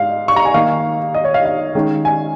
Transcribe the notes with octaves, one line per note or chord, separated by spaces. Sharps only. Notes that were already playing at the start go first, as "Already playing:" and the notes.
Already playing: G#2 F5
C#6
A#5
G#5
D#3 A#3 D#4 F5
D#5
C#5
F5
F5
D#3 G#3 C#4
G#5